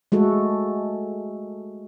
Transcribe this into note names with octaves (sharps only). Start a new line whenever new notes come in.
G#3 A3 F#4 A4